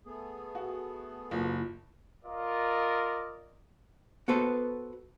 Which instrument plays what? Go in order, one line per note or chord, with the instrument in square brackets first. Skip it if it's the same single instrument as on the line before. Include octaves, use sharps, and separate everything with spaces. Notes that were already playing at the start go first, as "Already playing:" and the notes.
[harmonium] A3 B3 G#4
[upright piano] F#4
[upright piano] F#1 [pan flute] F4
[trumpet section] F4 A#4 D5 D#5
[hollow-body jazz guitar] B3 F#4 A4 B4 C5